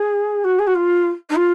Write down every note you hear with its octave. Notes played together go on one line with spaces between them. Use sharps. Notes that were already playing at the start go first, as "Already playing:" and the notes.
Already playing: G#4
F#4
G#4
F#4
F4
D#4
F4